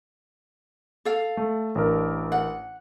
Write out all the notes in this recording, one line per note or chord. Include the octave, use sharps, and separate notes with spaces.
A4 F5
A3
A1 D4 A#4
F#5